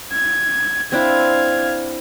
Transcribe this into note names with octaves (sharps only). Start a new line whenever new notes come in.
G#6
C4 D4 E4 F5 G#6